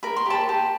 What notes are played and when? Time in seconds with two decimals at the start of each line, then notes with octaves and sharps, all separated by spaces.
0.03 A#4 B5
0.16 C6
0.26 G4 A5 B5
0.49 G4